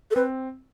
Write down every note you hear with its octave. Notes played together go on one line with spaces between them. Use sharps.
A4
C4 B4